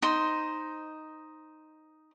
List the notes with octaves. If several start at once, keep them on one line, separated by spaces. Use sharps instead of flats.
D#4 C5